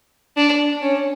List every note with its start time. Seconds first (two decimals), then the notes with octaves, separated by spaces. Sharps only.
0.37 D4
0.82 C#4